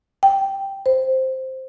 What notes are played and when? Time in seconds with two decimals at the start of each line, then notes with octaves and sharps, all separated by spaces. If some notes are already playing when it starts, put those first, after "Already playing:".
0.23 G5
0.86 C5